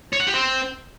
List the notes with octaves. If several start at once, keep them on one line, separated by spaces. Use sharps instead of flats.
C#5
F#5
G4
C4